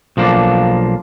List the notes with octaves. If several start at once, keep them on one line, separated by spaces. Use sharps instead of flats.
B1 F3 A#3 D4